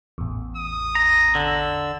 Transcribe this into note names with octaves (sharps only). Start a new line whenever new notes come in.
A1 E2
D#6
A#5
D3 E6